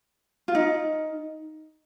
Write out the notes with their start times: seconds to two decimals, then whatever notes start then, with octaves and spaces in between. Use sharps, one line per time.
0.48 F4
0.55 D#4